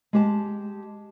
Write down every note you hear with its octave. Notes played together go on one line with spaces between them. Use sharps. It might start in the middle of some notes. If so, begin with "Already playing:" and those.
G#3 G4 A5